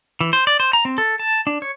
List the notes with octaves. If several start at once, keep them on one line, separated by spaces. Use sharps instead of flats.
E3
C5
D5
C5
A#5
C4
A4
A5
D4
C#5